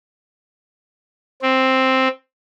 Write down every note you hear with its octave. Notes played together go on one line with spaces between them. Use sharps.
C4